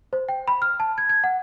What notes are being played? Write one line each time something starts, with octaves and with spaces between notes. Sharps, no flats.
C5
G5
B5
F6
A5
G#6
G#6
F#5